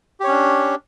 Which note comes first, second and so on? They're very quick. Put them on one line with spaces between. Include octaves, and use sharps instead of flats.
G4 C#5 C#4 D4